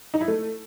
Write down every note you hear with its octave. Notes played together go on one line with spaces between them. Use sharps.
D#4
E4
A3